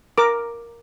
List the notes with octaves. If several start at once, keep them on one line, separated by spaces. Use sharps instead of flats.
A#4 D6